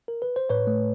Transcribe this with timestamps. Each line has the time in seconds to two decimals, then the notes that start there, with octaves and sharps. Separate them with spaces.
0.08 A#4
0.22 B4
0.36 C5
0.49 A2 B4 C#5
0.67 A3